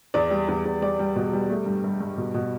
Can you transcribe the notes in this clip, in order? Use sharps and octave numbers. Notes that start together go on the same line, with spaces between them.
E2 D5
G3
E2
E2
G3 D5
G3
B2
G3
A3
G2
G2
G2
B2
B2